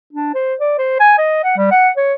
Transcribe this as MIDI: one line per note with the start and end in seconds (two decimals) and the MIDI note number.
0.13 0.31 62
0.34 0.55 72
0.60 0.74 74
0.78 0.97 72
1.00 1.14 80
1.18 1.43 75
1.44 1.57 78
1.57 1.70 55
1.71 1.89 78
1.97 2.14 73